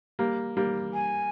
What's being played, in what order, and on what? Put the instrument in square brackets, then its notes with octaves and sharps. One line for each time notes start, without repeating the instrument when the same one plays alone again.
[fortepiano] G3 A#3
G3 A#3
[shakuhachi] G#5